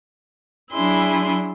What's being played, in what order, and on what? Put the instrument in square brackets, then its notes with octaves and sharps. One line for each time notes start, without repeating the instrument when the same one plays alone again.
[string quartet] F#3 D4 E4 G#4 C6